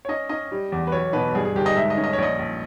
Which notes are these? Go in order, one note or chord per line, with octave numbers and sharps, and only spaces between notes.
C#5
C#4 D#5
C#4 D#5
G3
E2
B4
B1 C#5
B2 B4
G2 G#4
G#4
G1 G4
D#5
G#2 E5
D#5
C#4
D#5
C#5
A#1 D#5
A#1